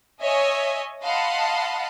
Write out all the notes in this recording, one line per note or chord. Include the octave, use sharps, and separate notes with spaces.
C#5 D#5 E5 G#5
D#5 F5 F#5 A5 B5 C6